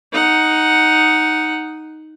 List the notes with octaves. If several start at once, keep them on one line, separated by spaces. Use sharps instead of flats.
D#4 F#5